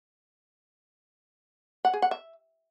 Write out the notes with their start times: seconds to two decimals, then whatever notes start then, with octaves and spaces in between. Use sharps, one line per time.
1.85 F#5
1.93 G#4
2.02 F#5
2.11 E5